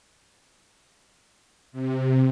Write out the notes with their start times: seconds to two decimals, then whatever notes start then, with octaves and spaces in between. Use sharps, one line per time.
1.72 C3